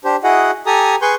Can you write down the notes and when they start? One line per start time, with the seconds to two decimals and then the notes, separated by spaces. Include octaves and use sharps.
0.04 D4 G4 C5
0.23 E4 F#4 G#4 D#5 F#5
0.66 G4 A4 G#5 A#5 D#6
1.02 G#4 B4 G#5 C6 C#6 G6